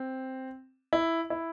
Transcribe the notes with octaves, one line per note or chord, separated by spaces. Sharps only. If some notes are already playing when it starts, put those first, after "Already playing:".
Already playing: C4
E4
E4